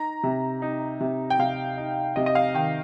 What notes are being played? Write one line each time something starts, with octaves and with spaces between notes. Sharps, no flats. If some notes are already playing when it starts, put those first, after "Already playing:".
Already playing: D#4 A#5
C3
D#4
C3
G5
C3 F5
D#4
C3 D#5
D#5
F5
D#3 G5